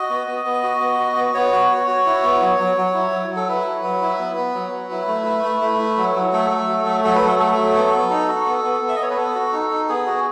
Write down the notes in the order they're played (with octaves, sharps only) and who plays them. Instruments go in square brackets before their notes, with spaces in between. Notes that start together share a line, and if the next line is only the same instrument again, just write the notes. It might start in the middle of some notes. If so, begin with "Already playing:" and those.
Already playing: [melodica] F#4 D#5
B3
B3
B3
F#4
B3
F#4
B3
B3 C#5
F#4
F#4
F#4
E4
B3
F#3
F#3
F#3
E4
F#3
F#3
A4
E4 B4
F#3
F#3
E4
B3
B3
F#3
F#3
E4
A3
E4
A3
A3
E4
F#3
F#3
A3 A4
A3
F#3
A3
F#3 A4
B4
F#3 A4
A3 A4
F#3
B3
B3
D#4
F#4
B3
B3
B3
E5
D#5
B3 C#5
B4
B3 A4
F#4
D#4
D#4
B3 G#4
F#4